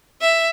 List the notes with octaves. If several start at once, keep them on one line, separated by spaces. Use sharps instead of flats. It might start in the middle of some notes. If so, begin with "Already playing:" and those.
E5